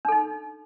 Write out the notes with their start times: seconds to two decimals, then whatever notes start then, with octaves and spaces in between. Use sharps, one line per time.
0.05 D4
0.08 A4
0.12 D#4